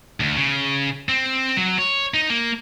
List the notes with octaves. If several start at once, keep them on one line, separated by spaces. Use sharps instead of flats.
D2
C#3
C4
F#3
C#5
D#4
A#3